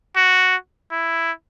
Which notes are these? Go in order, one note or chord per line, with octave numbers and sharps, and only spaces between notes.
F#4
E4